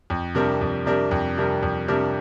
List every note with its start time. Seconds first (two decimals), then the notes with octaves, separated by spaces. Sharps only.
0.10 F2
0.35 C3 G3 D4 A#4
0.61 F2
0.86 C3 G3 D4 A#4
1.11 F2
1.37 C3 G3 D4 A#4
1.63 F2
1.88 C3 G3 D4 A#4